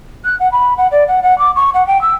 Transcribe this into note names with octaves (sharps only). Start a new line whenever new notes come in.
F#6
F#5
B5
F#5
D5
F#5
F#5
D6
C#6
F#5
G5
E6